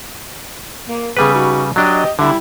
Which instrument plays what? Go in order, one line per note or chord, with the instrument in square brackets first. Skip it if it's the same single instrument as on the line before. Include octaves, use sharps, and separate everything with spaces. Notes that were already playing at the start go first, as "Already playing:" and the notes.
[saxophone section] A#3
[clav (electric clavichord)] C#3 G3 B4 [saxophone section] B3 G#4
[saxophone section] D#4 F#4
[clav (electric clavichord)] F#3 D4 [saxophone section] G4 D#5
[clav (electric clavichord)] D3 [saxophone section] G3 E4